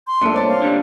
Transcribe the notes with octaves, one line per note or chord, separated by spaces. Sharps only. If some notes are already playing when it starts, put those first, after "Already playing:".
C6
C2 A#2 A3 D4
C4 C#5 D5 A5
F5
D3 G3